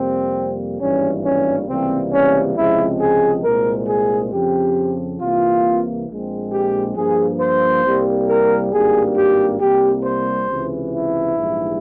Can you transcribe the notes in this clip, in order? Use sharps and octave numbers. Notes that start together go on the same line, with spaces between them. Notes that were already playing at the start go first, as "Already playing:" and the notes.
Already playing: F2 C3 G3 A#3 C4
G#1 G2 E3 G3 A#3 C#4
C#4
C#2 C3 E3 G3 A#3 C4
C#4
C#2 C3 F3 G#3 C4 E4
G#4
C2 A#2 G#3 C4 A#4
G#4
F2 C#3 F3 C4 G4
C2 C3 E3 A#3 F4
A#1 A#2 G#3 C4
G4
G2 F3 A#3 G#4
C5
C2 C3 G3 A#3
A#4
G#1 G2 G3 A#3 G#4
G4
C2 C3 G3 A#3 G4
C5
C#2 C3 E3
E4
A#1 G#2 E3 G3